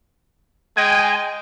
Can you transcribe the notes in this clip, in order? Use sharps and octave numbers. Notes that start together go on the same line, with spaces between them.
G#3 D#5 G5 G#5